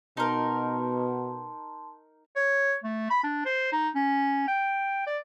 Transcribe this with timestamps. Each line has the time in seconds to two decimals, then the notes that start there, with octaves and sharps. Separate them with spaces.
0.17 B2 D#4 A#4 A5 C6
2.36 C#5
2.84 A3
3.10 B5
3.24 D4
3.46 C5
3.72 D#4
3.95 C#4
4.48 G5
5.07 D5